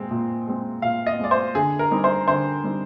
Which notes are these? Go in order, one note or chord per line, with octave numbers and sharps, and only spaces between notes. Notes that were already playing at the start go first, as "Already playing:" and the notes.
Already playing: A#2 G#3 C4
A#2
G#3 C4
A#2 F5
D#5
G#3 C4 D5
C5
D3 G#4
A#4
G3 C4 D#4
C5
D3 C5
G3 C4 D#4